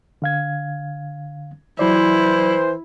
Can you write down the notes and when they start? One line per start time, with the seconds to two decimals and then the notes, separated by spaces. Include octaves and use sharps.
0.22 D3 F5 G#6
1.79 E3 F#3 E4 C5 D5